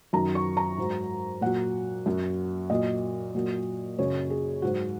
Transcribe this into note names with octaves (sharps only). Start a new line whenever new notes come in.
F#2 D#3 F#3 A#5
C#6
A#5
G#2 F#3
A#2 F#3 F#5
F#2 F#3
A#2 F#3 D#5
A#2 F#3
F#2 C#3 F#3 C#5
G#4
G#2 F#3 F#4